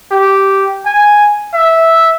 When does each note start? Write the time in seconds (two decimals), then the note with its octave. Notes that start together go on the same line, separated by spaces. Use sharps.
0.12 G4
0.86 G#5
1.54 E5